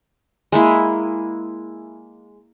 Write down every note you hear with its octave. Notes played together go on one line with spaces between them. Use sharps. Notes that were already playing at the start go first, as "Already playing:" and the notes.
G#3 A#3 E4